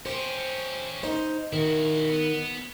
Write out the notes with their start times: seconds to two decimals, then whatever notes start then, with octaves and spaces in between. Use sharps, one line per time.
0.06 C#4 G4 C5
1.03 D#4 C5
1.53 D#3 E4 F#4
2.10 B3